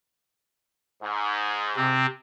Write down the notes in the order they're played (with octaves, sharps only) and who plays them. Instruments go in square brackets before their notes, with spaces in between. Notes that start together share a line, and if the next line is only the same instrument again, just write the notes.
[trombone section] G#2
[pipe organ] C3 C4